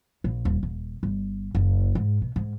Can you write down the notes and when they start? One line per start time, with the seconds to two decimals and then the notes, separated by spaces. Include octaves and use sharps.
0.24 A#1
0.45 D#1
0.63 D#1
1.03 G1
1.55 F#1
1.95 G#2
2.22 B2
2.36 G#2